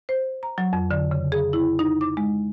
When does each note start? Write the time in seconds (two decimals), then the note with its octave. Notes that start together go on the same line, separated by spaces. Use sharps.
0.09 C5
0.43 A#5
0.58 F#3
0.73 F2
0.91 D3
1.11 C#3
1.32 G#4
1.53 E4
1.79 D#4
2.01 D6
2.17 G#3